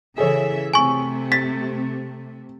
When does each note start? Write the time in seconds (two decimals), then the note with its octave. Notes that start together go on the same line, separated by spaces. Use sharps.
0.18 C#3 E3 G#4 A4 C#5 E5
0.73 C3 A3 G#5 C#6
1.32 A6 B6